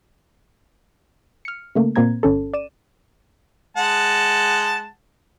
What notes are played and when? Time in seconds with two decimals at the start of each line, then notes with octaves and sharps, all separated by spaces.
1.45 F6 C#7
1.75 C#3 A3 A#3
1.96 A#2 A#3 C4 A#5 G#6
2.23 G1 C#4 A4
2.54 D5 D#7 E7
3.77 G#3 F#5 A5